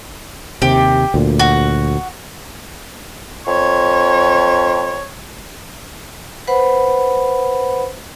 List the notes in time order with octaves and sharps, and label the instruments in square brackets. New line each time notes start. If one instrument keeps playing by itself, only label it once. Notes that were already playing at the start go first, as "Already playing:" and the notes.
[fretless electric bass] D#2 C3 [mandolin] G4
[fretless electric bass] D2 A#2
[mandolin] F#4
[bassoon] F2 [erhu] C#5
[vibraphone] B4 C5 F#5 B5